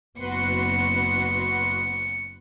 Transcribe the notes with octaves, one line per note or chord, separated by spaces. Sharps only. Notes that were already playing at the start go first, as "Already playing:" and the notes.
F#1 B3 F#4 B4 C6 C#7